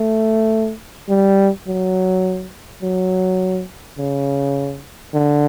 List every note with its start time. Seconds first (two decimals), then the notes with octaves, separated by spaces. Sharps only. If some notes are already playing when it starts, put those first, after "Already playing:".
Already playing: A3
1.09 G3
1.67 F#3
2.82 F#3
3.98 C#3
5.14 D3